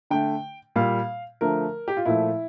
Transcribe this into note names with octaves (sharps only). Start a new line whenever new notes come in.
D3 A3 G5
A#2 G3 F5
D3 F3 A3 A#4
G4
F4
A#2 F3 A3 E4